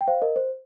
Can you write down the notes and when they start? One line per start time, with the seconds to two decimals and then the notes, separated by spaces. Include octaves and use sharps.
0.01 G5
0.08 C5 F5
0.22 A#4 D#5
0.36 C5